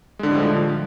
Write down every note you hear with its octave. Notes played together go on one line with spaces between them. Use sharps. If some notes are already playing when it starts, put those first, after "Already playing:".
A2 D3 F3 G3 G#3